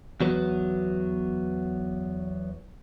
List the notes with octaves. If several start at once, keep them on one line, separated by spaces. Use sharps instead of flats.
E2 F#3 B3